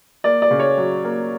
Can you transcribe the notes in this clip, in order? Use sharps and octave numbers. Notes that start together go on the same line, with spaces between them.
A#3 D5
D5
C#3
C#5
F#3
A#3